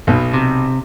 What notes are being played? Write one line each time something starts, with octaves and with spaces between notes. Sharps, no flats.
B1 B2
C3